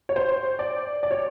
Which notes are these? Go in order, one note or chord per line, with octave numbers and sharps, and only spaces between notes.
C#5
C5
D5
D5
C#5